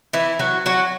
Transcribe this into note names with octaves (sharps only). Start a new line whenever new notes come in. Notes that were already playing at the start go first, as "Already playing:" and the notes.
E3 E4
F#3 F#4
F#3 F#4